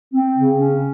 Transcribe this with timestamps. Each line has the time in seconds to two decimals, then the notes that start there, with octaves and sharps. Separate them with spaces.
0.13 C4
0.35 C#3
0.57 C#4